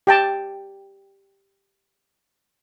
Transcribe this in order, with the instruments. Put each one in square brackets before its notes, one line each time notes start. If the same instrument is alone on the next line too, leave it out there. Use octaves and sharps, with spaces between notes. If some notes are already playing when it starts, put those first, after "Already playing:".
[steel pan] G4 G5 A5